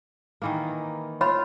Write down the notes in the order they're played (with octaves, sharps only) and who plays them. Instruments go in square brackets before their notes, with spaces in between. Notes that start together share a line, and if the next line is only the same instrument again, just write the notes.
[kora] D#3 E3 A#3
[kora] F4 [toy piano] C#5 B5